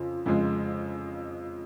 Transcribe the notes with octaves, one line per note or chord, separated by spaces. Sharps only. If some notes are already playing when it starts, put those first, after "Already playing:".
Already playing: F2 C#3 F4
F2 C#3 G#3